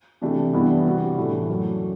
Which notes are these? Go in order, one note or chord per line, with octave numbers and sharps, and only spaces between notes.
C3 E3 A3 D4 G4
G2 E3 G3 B3 E4
C3 G3 C4 F#4
A2 E3 A3 D4
F#2 F#3 A3